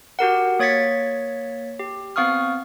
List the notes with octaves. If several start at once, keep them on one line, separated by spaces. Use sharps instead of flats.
F#4 G4 A#4 F#5
A#3 C#5 G#6 A6 B6 C#7
G4
B3 C4 F5 C#6 D#6 F6